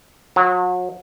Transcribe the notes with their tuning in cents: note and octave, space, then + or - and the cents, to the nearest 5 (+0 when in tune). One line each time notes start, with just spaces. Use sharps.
F#3 -35